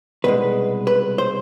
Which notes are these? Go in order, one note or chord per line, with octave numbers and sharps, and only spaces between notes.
C2 B2 G#3 B4
B4
C5